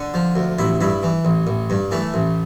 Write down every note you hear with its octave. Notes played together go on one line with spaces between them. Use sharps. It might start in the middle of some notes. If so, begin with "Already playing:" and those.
Already playing: D3
F3
D2
A1 E4
G2 E4
E3
A1
A1
G2
E3 A3
A1